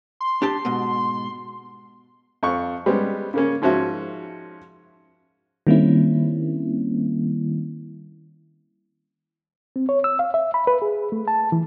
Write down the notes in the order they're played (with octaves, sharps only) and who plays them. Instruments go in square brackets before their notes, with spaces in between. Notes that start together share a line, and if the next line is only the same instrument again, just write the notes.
[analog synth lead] C6
[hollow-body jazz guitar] D4 G4 A5
G#2 B2
[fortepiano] F2 C#6
G3 G#3 B3 C#4
C#3 A#3 C#4
G#2 F3 C#4 F#4 E5
[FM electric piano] D#3 G3 A#3 C4 C#4 E4
[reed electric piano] C4
C#5
E6
F5
E5
B5
B4
G#4
A3
A5
E3